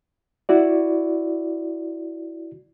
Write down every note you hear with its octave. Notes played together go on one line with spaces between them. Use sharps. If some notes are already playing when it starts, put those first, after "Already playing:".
E4 F#4 D5